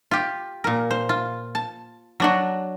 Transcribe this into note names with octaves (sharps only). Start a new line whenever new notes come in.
F4 G4
A#2 A#4
C5
F4
A5
F#3 D4 F#4